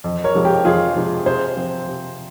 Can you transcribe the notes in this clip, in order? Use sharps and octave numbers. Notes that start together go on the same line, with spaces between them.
F2
A#4 C#5
C3 F3 G#3
G4 A#4
F2 F4 G#4
C3 F3 G#3
C3 G#4 C5
F3 C4
C3